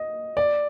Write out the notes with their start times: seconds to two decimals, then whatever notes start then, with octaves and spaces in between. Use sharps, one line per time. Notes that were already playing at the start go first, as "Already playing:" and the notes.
Already playing: D#5
0.37 D5